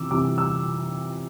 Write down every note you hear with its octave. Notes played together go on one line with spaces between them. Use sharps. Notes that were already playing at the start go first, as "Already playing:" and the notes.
Already playing: C3 E3 D6 E6
C3 E3 G3 D6
E6